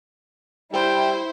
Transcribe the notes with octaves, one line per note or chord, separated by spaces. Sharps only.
G3 E4 C5 G5